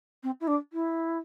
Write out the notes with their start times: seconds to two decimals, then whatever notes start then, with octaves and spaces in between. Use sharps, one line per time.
0.23 C4
0.40 E4
0.47 D4
0.73 E4